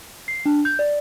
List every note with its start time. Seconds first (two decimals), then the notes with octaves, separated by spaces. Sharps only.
0.28 C7
0.46 D4
0.65 G6
0.79 D5